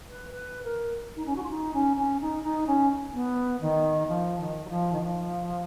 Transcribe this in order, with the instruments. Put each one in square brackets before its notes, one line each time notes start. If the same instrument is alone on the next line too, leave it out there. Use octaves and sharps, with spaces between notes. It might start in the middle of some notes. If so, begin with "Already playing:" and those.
[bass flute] B4
B4
A#4
D#4
C#4
F#4
F4
D#4
C#4
C#4
D#4
D#4
C#4
B3
D#3
F3
D#3
F#3
F3
D#3
F3